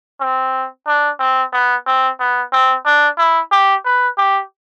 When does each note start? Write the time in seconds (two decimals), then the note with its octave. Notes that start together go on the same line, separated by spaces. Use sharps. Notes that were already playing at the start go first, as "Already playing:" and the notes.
0.21 C4
0.87 D4
1.19 C4
1.53 B3
1.87 C4
2.20 B3
2.52 C4
2.85 D4
3.18 E4
3.52 G4
3.85 B4
4.18 G4